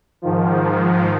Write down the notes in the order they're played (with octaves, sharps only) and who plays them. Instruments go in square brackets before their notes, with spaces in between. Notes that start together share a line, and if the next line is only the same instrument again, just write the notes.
[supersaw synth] G#2 D#3 F3